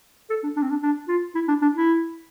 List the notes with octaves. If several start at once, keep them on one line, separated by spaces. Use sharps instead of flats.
A4
D4
D4
C4
D4
D4
F4
E4
D4
D4
E4